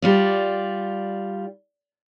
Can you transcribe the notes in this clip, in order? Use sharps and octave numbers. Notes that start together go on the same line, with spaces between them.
G3 F4 D5